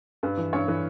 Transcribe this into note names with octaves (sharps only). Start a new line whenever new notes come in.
G2 B4
E3
G2 C#5
E3 B4